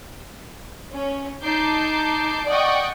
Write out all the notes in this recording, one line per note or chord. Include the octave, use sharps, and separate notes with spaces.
C#4
D#4 A5 D6 G6 C7
D5 D#5 F#5 G5 C#6 D#6